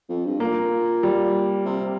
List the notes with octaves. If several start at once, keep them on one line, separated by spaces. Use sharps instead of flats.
F2
G2
A#2 A#3
G3
C3